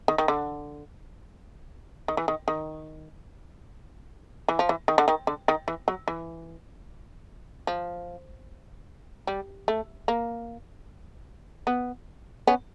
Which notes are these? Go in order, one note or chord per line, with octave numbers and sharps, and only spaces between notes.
D#3
D#3
D3
D#3
E3
D#3
D#3
E3
F3
E3
D#3
D3
D#3
D3
D#3
E3
F#3
E3
F3
G3
A3
A#3
B3
B3 C#4